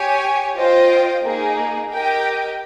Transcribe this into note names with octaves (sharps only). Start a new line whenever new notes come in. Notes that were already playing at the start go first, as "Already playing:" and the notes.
Already playing: G4 C#5 G#5
F4 C5 D#5 G5
A#3 D#4 G#4
G4 A#4 D#5 G5